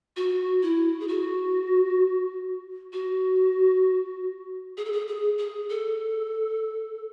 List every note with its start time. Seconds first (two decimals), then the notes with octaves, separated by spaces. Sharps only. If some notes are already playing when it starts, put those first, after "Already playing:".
0.16 F#4
0.62 E4
1.00 G#4
1.08 F#4
2.93 F#4
4.77 G#4
4.85 A4
4.92 G#4
5.08 G#4
5.38 G#4
5.70 A4